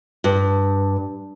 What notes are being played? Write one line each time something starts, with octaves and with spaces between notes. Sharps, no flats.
G2